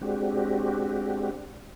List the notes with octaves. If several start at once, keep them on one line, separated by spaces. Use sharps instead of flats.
G#3 C4 D4 F#4 G4